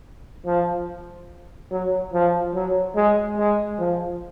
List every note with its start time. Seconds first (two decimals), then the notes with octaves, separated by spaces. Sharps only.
0.46 F3
1.71 F#3
2.14 F3
2.55 F#3
2.96 G#3
3.38 G#3
3.79 F3